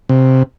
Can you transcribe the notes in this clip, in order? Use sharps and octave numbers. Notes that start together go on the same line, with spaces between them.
C3